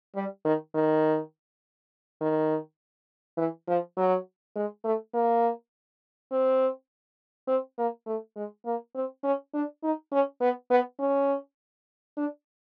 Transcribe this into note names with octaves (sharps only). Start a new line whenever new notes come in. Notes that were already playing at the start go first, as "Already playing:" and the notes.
G3
D#3
D#3
D#3
E3
F3
F#3
G#3
A3
A#3
C4
C4
A#3
A3
G#3
A#3
C4
C#4
D4
D#4
C#4
B3
B3
C#4
D4